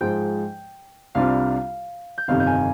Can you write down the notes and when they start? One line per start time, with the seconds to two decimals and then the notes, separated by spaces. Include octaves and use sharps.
0.01 G#2 F3 G#3 G5 G6
1.15 C2 C3 G3 D4 F4 F5 F6
2.18 G6
2.28 G1 F2 C3 D#3 F5 F6
2.40 G6
2.47 G#5 G#6